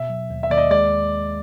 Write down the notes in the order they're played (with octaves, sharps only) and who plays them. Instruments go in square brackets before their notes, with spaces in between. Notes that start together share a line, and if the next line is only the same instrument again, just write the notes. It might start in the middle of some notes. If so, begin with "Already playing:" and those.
Already playing: [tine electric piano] B2 [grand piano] E5
[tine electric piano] F#3
D#2
[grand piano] E5
[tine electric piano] D#2 [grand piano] D5
[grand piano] D#5
[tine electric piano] G#3 [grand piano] D5